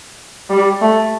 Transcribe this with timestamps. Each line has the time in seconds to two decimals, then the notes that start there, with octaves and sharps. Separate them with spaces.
0.50 G3
0.81 A3